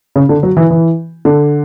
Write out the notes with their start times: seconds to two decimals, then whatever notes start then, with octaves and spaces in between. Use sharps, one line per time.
0.16 C#3
0.29 D3
0.43 F#3
0.57 E3
0.70 E3
1.25 D3